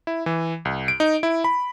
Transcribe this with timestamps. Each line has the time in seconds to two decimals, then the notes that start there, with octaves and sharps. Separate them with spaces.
0.07 E4
0.26 E3
0.65 C2
0.88 D7
1.00 D#4
1.23 E4
1.44 B5